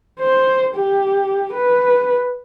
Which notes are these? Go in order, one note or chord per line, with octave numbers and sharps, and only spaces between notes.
C5
G4
B4